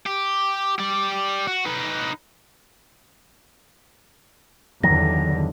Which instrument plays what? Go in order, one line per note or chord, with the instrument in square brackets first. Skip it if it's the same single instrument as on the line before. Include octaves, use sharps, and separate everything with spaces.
[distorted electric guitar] G4
G4 D5
F#4
D#4 B4
[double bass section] E2 G2 D3 [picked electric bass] D#3 F#3 [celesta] A#6